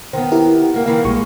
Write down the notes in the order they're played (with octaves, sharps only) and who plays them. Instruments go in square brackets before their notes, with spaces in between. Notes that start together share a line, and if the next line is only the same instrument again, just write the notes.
[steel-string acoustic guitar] D#3 B3 [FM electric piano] C5
[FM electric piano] E4 G4 A#4
[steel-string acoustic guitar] A#3 F#4
[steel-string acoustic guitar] D#3 E3 A#3 [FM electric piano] F5
[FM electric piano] A#1 G3 C#6 [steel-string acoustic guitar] G#3